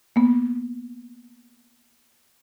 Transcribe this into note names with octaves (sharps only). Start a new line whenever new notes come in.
A#3 B3